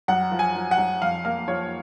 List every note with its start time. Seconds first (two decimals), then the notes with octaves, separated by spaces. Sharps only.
0.08 F#2 F#5
0.32 F3
0.39 G#5
0.56 F3
0.71 F#5
0.78 F#2
1.02 F2 F5
1.25 A#3 F5
1.48 F3 C#5